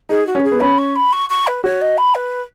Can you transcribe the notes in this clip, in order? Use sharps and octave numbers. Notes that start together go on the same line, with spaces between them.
D#4 G#4
F#4
C#4
B4
G#4
B3
C#4 B5
C#6
B5
C#6
C#6
B4
F#4 C#5
D#5
B5
B4